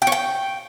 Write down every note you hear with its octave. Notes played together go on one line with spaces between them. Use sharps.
G5
C#5
G5